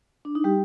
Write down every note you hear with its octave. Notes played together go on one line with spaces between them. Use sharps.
D4
D#4
G3 G4